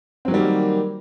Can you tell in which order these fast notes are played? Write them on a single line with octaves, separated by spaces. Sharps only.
C4 F#3 D#3 G3 A#3